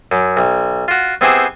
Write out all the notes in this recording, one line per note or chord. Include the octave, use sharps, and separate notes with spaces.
F#2
B1
F4 F#4
B3 C4 E4 G4 G#4 C5